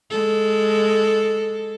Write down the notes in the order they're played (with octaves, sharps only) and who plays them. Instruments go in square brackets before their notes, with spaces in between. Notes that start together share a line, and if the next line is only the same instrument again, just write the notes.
[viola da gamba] G#3 A4